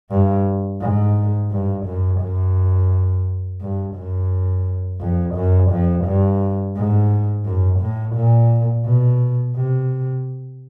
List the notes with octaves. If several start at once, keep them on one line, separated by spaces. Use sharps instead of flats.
G2
G#2
G2
F#2
F#2
G2
F#2
F2
F#2
F2
G2
G#2
F#2
A2
A#2
B2
C3